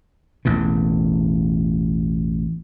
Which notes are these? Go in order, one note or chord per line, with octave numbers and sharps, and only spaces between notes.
A1 E2 B2